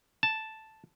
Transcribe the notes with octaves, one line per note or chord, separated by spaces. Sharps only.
A5